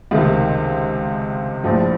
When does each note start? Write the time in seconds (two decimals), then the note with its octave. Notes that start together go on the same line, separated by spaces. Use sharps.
0.11 C#2 C3 D#3 A3
1.64 A#1 A2 F3